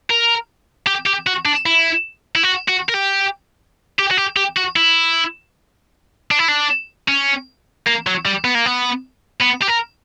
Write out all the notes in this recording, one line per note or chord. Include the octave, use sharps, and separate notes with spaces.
A#4
G4
G4
F#4
D4
E4
E4
F#4
F#4
A#4
G4
G4
F#4
G4
G4
F#4
E4
D4
E4
D4
C#4
A#3
F#3
G3
B3
A#3
B3
B3
G4
A#4